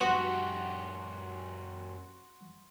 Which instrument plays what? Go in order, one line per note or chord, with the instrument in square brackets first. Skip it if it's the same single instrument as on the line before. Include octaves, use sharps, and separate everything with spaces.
[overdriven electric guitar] F#2 G4 [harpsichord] B3 [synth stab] F#4 [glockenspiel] C6 C#6